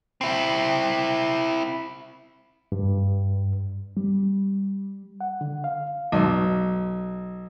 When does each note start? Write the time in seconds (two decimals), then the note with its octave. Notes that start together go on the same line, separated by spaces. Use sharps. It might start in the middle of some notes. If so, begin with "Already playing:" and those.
0.21 C4 E4
2.72 G2
3.97 G3
5.21 F#5
5.41 D3
5.64 F5
6.12 B1